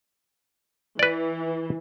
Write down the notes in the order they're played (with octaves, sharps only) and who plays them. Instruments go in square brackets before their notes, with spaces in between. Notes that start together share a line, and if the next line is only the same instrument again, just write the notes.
[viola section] E3 [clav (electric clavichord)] B4 D5